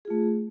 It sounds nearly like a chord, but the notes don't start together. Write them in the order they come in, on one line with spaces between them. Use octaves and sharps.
G#4 F4 A3